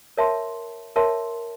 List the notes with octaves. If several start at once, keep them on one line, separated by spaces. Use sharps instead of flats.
A#4 C#5 E5 A5 C6
A#4 C#5 E5 A5 C6